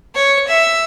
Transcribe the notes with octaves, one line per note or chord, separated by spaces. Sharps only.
C#5
E5